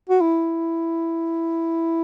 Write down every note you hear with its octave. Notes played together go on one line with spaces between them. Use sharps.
F#4
E4